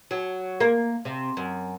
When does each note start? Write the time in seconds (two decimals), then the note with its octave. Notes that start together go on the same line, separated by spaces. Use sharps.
0.11 F#3
0.60 A#3
1.05 C3
1.37 F#2